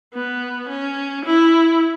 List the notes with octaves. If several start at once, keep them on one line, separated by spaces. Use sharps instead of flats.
B3
C#4
E4